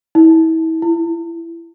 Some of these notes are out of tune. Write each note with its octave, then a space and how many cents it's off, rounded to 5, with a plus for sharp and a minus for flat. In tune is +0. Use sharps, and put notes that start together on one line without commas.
E4 -35
E4 +25